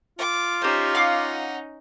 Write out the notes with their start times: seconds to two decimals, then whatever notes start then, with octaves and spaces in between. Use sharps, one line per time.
0.19 F4 D6
0.62 C#4 D#4 G4 C5
0.95 F5 F#5 D6